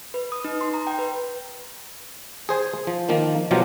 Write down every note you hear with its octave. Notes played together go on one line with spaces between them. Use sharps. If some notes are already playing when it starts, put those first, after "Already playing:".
B4
D#6
D#4
C6
A#5
G5
B4
G#4 C5 G#5
F3
D#3 F3 A#3
B2 F3 F#3 F4 G4